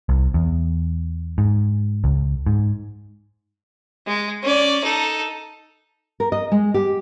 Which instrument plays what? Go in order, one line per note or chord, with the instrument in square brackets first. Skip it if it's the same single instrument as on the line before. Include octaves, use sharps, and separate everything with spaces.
[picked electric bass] C2
E2
G#2
C#2
G#2
[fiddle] G#3
C#4 D5
D#4 A4
[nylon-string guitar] A#4
D#5
G#3
G4